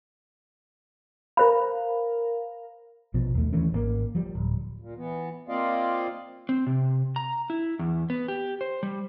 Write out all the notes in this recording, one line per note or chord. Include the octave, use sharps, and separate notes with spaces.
A#4 C5 F5 B5
A#1 B2 F3
D#2 A3
D#3 E3 A3 C#4
G#1 E3 A#3
F3 G3
D1
A#2
E3 B3
A#3 C4 F4 D5 D#5 F5
C4
C3
A#5
E4
E2
B3
G4
C5
G3